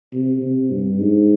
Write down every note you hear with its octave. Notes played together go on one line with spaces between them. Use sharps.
C3
C3
G2
G#2